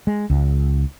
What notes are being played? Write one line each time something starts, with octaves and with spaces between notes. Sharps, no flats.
G#3
C#2